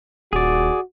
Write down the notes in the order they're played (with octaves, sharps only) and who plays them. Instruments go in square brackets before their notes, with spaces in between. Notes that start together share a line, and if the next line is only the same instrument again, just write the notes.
[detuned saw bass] D#1 [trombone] F#4 [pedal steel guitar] G#4 D5